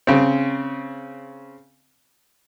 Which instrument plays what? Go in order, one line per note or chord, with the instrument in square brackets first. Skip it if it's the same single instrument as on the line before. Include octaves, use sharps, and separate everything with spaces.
[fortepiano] C#3 C4